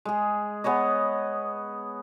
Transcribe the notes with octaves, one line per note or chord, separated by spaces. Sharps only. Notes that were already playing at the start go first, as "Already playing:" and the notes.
G#3 G#4
B3 G#4 C#5 D#5